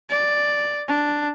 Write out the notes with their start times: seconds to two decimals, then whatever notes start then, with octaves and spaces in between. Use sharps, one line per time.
0.10 D5
0.88 D4